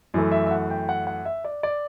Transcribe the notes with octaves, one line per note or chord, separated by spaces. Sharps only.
F#2 E3 A3
E5
E5
F#5
G5
F#5
F#5
E5
D5
D5